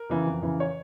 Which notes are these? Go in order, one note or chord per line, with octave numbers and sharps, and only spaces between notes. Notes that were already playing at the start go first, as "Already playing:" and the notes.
Already playing: A#4
C#3 E3
F2
C#3 E3
C#5